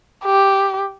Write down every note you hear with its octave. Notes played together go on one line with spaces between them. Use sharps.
G4